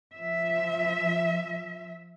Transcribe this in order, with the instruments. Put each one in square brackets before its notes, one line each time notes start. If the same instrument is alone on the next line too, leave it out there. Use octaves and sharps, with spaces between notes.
[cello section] F3 E5